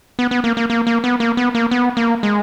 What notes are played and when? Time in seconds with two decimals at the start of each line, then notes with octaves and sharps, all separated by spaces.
0.19 B3
0.31 B3
0.44 A#3
0.57 A#3
0.70 A#3
0.87 A#3
1.04 B3
1.20 A#3
1.37 B3
1.55 A#3
1.71 B3
1.97 A#3
2.23 G#3